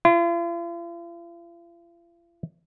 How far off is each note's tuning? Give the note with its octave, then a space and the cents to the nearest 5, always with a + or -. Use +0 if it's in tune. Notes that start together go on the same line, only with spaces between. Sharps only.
F4 -45